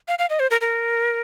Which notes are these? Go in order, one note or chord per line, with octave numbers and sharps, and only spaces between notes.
F5
F5
D#5
C5
A#4
A#4